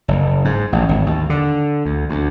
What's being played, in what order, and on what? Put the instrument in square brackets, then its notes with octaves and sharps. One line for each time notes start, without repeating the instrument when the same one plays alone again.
[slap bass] F#1
G#2
A1
G#1
D#2
D3
D2
D2